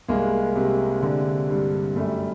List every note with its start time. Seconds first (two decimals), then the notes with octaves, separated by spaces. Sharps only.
0.08 C2 G#3 A#3
0.56 C3
1.02 D3
1.49 G2
1.96 F#2 G3 A3